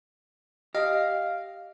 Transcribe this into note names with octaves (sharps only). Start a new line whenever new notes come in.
G4 D#5 F5